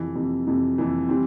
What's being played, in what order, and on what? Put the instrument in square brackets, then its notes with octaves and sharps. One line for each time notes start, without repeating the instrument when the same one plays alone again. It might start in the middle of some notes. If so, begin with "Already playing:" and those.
Already playing: [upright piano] F2 C3 E3
F2 C3 E3
F2 C3 E3
F2 C3 E3
E3 G3 C4